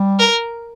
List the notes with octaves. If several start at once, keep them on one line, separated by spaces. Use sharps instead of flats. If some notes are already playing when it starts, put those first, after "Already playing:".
Already playing: G3
A#4